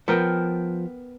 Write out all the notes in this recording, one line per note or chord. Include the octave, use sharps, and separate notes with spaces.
F3 B3 A#4 G5